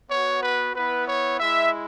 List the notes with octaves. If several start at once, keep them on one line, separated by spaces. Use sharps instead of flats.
B3 F#4 C#5
B4
B3 E4 B4
C#5
G#3 E4 E5